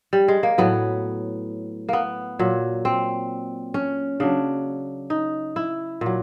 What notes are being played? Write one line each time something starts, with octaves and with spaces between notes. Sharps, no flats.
G3
G#3
A#3
A2 F#3 B3
A#3 B3
A#2 F#3
C4
C#4
C#3 F#3 D4
D#4
E4
A#2 F#3